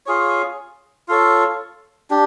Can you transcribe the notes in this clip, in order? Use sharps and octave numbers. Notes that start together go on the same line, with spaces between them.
F4 G#4 C#5
F4 A4 C#5
D4 G4